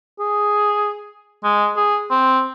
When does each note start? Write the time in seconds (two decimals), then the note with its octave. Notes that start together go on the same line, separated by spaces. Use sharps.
0.20 G#4
1.44 G#3
1.77 G#4
2.11 C4